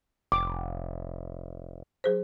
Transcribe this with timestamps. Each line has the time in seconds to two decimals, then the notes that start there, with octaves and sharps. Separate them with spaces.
0.32 F1 D6
2.04 F#3 G#4 C5